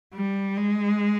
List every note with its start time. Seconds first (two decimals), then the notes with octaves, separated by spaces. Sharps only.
0.14 G3
0.58 G#3